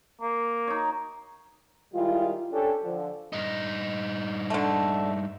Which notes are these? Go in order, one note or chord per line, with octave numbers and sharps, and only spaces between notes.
A#3
D#4 C#5
D#3 G3 G#3 E4 F4
C#4 D4 G4 A4
D3 F3
G2 D#4
D3 A3